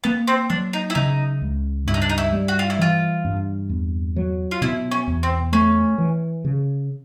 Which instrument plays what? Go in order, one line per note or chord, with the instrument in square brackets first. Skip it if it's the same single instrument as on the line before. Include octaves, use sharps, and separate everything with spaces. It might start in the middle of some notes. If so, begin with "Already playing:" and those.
[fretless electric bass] A#3 [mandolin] B3
[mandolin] C4
[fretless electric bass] F#3 [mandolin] D4
[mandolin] D#4
E4
[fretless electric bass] C#3 [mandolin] D#4
[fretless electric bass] C#2
[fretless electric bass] G2 [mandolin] E4
[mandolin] D#4
D4
D#4
E4
[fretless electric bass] G3
[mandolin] F#4
F4
E4
[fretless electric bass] E3 [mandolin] F4
[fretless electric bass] G2
E2
F#3
[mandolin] F4
[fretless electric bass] B2 [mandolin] E4
[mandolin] C#4
[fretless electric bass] E2
[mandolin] C4
[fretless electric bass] A3 [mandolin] C#4
[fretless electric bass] E3
C#3